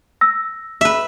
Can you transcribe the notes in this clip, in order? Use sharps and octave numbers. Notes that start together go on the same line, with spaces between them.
E6 A#6
B4 E5